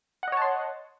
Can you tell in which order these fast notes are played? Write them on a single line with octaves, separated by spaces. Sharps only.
F#5 D#5 C#5 A5 C6